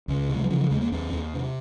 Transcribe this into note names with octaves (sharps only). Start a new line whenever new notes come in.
C#2
C3
G#3
F#3
C#3 F3
F3
D#2 G#3
A#3
D#2 C4
D#2
C3